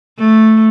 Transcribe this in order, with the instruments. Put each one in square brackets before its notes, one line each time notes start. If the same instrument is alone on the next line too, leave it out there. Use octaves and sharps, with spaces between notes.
[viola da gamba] A3